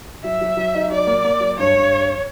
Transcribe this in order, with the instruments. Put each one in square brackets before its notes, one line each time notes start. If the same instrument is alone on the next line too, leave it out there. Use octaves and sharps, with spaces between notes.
[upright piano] F#3 [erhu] E5
[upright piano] F#3
F#3
D#4
[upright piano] F#3 [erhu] D5
[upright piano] A#3
A#3
F#3
[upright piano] G2 [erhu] C#5
[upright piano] G2